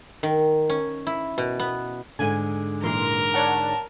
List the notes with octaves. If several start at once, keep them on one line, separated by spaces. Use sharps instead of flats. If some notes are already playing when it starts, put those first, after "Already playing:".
D#3
C#4
E4
B2
B3
G#2 D3 G#5
A#2 E3 A#4 C6
C#5 D5 F#5 A5